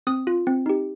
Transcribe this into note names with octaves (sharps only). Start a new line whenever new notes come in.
C4 D#6
F4
C4
D#4 G4